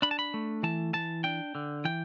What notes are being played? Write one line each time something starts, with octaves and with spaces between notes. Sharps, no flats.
D4 B5
A5
B5
A3
E3 A5
E3 A5
D4 G5
D3
E3 G5